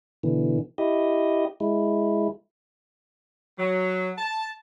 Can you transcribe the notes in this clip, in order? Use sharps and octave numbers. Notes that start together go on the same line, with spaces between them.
B2 D3 E3
E4 G4 D#5
G#3 E4
F#3
A5